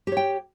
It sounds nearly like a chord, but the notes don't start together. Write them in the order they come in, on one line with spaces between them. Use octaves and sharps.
G4 C#5 G5